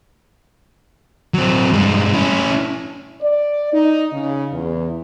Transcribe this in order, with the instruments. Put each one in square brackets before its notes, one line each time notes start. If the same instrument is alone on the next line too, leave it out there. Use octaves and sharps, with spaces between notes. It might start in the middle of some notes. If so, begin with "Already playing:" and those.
[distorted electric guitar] F#3 C4
G2 G#3
C#4 E4
[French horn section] D5
D#4
C#3
E2